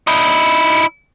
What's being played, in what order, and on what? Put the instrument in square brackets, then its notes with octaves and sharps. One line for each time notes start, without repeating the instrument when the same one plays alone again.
[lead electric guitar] D#4 E4